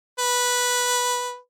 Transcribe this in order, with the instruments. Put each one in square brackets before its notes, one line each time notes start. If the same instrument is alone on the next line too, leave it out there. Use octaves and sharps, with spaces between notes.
[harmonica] B4